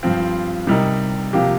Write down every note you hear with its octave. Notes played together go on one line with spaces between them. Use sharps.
G2 F3 C4 F4
C3 G3 D#4 A#4
C3 F3 A#3 G4